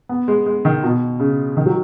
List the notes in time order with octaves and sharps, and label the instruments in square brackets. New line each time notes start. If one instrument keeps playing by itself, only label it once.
[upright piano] B3
G#3
G#3
D#3
B2
C#3
D#3
F#3